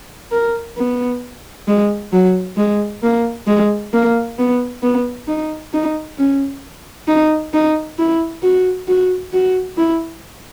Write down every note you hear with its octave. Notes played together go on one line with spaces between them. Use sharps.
A#4
B3
G#3
F#3
G#3
A#3
G#3
A#3
B3
B3
D#4
D#4
C#4
D#4
D#4
E4
F#4
F#4
F#4
E4